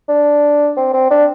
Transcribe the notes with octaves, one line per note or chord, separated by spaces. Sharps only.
D4
C4
C4
D4